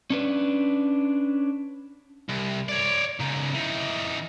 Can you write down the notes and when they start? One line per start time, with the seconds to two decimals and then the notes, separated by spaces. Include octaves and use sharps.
0.10 C#4 D4 B4
2.29 C2
2.69 C#5 D5
3.20 C#3 D#4
3.54 E3 D#4